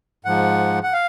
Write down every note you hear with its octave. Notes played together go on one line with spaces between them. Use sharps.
G#2 F3 F#5
F#5
F5